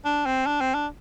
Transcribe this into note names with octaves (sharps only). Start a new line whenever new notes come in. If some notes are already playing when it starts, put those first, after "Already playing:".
D4
C4
D4
C4
D4